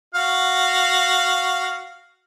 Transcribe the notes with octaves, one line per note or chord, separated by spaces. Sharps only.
F#4 F5